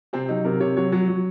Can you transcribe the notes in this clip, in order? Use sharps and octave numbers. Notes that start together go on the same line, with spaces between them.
C3 C4
F#3 D#4
C3 A#4
C3 C#5
F#3 C#5
F#3 C#5
F#3